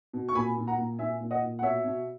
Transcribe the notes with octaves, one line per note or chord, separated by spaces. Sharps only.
B2
C#6
A#2 G#5 B5
A#2
F#5 A#5
A#2
A#2 E5 G#5
A#2
D#5 F#5
A#2
F#5
B2 C#5 E5
B2